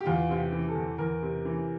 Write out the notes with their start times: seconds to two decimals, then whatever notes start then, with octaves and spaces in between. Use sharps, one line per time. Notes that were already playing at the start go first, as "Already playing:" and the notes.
0.01 G4
0.06 E2 F4
0.29 C3 F4
0.36 G4
0.52 E3
0.68 A4
0.75 E2
0.98 E2 A#4
1.22 C3
1.45 E3